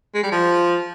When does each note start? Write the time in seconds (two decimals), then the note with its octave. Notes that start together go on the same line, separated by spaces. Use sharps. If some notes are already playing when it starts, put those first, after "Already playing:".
0.14 G#3
0.23 G3
0.32 F3